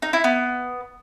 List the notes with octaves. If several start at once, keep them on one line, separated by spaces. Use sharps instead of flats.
D#4
E4
B3